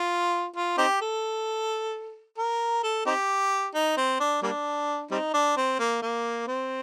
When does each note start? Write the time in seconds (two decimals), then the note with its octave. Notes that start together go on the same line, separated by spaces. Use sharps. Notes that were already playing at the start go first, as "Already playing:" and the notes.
Already playing: F4
0.56 F4
0.78 C4 D#4 G4
1.01 A4
2.38 A#4
2.83 A4
3.06 C4 D#4 G4
3.74 D#4
3.97 C4
4.20 D4
4.43 G3 A#3 D4
5.11 G3 C4 D#4
5.34 D4
5.57 C4
5.79 A#3
6.02 A#3
6.48 C4